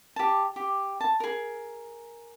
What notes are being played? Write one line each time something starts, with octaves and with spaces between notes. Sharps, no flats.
G4 A5
G4
A5
G#4 A#4